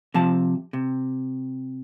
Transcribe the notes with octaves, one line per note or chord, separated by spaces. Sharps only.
C3 F3 A5
C3